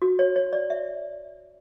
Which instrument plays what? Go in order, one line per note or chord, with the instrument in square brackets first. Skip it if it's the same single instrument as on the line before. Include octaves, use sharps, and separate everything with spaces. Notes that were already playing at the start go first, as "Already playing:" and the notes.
[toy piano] F#4
C#5
C#5
D5
E5